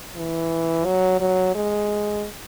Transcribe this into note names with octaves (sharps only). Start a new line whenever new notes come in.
E3
F#3
F#3
G#3